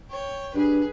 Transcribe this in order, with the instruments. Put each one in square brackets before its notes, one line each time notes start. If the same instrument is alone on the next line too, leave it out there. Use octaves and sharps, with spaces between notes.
[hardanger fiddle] C#5 G5
[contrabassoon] G2 [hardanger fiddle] G#4 B4